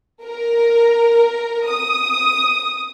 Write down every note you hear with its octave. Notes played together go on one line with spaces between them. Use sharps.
A#4
D#6